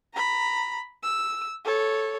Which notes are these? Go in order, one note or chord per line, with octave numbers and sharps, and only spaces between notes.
A#5 B5
E6
A4 C#5